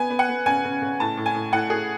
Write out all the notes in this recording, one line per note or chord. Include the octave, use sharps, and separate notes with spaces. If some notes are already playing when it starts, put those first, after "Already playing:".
Already playing: B3 G#5
B3
F#5
B3
C#3 G#5
C#3
C#3
A2 A5
A2
G#5
A2
A2 F#5
A2 G#4